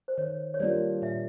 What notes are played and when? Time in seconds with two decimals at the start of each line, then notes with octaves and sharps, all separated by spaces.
0.08 C5
0.18 D#3 C#5
0.54 C#5
0.60 G3 A#3 D4 F4 D5
1.02 A#2 E5